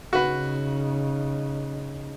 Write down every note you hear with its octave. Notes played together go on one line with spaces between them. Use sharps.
C#3 D#4 F#4 B4